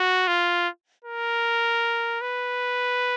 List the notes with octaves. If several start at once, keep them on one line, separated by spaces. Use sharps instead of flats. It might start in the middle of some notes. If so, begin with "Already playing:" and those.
Already playing: F#4
F4
A#4
B4